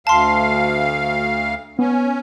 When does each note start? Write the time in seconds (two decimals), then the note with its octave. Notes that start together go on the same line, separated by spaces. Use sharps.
0.07 D2 F5 A5 C6
1.79 B3 C#4